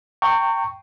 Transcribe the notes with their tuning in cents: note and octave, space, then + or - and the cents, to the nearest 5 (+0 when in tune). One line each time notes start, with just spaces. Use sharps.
G5 +0 A#5 -35 C#6 +0